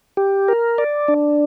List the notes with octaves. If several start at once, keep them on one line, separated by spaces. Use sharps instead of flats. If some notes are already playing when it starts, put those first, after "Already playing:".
G4
A#4
D5
D4